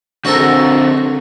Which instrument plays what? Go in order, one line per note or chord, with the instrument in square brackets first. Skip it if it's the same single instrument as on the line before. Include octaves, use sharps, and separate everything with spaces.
[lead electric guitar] D3 C4 [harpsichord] F#4 A4 A#4